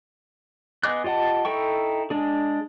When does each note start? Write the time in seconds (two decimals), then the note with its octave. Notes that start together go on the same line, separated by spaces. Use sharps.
0.84 B3 G#4 D#5 D6 F#6
1.04 F4 G4 D#5 F#5 A5
1.45 D#4 E4 A4 G5 C#6
2.10 G#3 D4 G#4